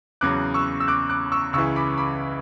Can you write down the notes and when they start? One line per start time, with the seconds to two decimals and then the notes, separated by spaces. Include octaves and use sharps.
0.21 E2 C#3 F#3 D6 F#6
0.54 C#6 E6
0.80 E6
0.88 D6 F#6
1.09 D6 F#6
1.32 C#6 E6
1.53 C#2 C#3 E3 C#6 E6
1.76 B5 D6
1.97 B5 D6